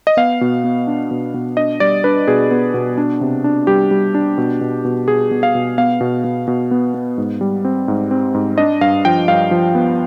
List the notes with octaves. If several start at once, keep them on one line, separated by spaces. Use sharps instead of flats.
D#5
B3 F5
B2
B3
D4
B2
B2
D4 D#5
G3 D5
D4 B4
B2 G#4
B3
B2
D4
C3
D4
G3 G4
G3
D4
B2
B2
B2
B2 G#4
B2
F5
B2
B3 F5
B2
B2
B2
B3
B3
G#2
G3
C4
G#2
C4
G#2
D4 D#5
G2 F5
F3 G5
G2 F5
F3
B3